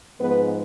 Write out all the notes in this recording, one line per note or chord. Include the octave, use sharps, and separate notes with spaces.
G#2 F3 G#3 B3 B4